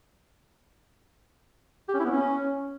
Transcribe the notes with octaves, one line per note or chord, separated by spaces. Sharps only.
G4
C#4
E4
B3
C#4